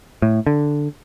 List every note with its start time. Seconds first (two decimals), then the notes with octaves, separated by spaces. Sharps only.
0.22 A2
0.47 D3